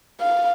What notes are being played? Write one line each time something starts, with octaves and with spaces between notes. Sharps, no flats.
F5